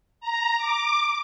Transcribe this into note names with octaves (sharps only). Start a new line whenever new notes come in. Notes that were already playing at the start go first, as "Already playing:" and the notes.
A#5
D6